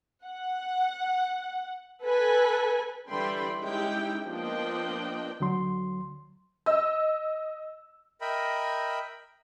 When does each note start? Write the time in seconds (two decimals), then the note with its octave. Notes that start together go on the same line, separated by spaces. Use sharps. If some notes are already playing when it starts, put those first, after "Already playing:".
0.24 F#5
2.03 A4 B4 G#5
3.08 D3 E3 G3 G5 B5 C6
3.61 G#3 C#4 D#4 E4 G4 G5
4.26 F3 A#3 B3 D4 D#5 G5
5.40 D2 D3 F#3 C6
6.66 D#5 E6
8.21 A#4 D#5 E5 G5 B5